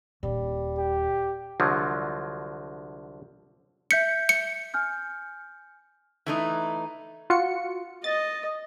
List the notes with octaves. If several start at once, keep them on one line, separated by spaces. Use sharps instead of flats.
D#1 G3
G4
C2 D3 F3 F#3
E5 G6 B6 C#7
C#7
G#5 F6 G6
E3 A3 D#4
F4 F#4 C#7
D#5 A6